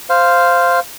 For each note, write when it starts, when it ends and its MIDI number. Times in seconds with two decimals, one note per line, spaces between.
0.09 0.80 72
0.09 0.80 77